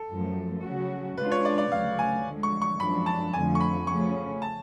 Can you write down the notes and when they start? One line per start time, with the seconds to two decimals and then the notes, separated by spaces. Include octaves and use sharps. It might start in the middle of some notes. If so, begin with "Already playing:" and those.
Already playing: A4
0.10 F#2 F3 A3
0.64 C#3 F#3 C#4 F#4
1.17 C#3 G#3 D4 F4 B4
1.32 C#5
1.45 D5
1.58 D5
1.72 D2 C#3 F#3 A3 F5
1.99 G#5
2.26 D3 F3 G#3
2.43 C#6
2.62 C#6
2.80 F#2 F3 G#3 D4 B5
3.06 A5
3.33 F2 D3 F3 A3 G#5
3.55 C#6
3.60 B5
3.87 C#3 F3 A3 C#4 C#6
4.42 A5